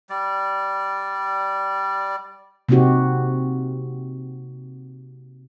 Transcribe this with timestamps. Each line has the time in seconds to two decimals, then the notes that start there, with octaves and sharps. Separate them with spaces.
0.10 G3 D5
2.69 C3 A#3 C4 D#4 F#4 G4